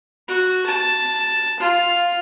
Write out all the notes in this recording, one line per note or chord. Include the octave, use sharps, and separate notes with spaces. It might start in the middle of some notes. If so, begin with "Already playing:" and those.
F#4
A5
F4